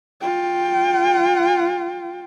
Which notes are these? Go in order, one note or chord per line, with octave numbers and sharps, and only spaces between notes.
F4 G5